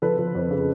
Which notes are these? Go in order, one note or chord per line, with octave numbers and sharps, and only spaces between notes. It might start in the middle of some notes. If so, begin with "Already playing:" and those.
F3 A4 B4
F3
F2
C#3